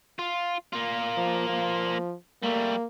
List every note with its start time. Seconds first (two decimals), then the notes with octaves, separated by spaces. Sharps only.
0.19 F4
0.73 A#3 F4
1.17 F3
1.50 F3
2.43 G3 A3 A#3